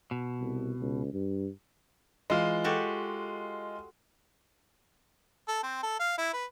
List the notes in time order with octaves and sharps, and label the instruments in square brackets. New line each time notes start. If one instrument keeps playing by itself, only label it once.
[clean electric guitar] B2
[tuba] C2
C#2
G2
[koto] E3 [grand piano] G#3 F4
[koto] F#4 G4 A4
[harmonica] A4
C4
A4
F5
E4
B4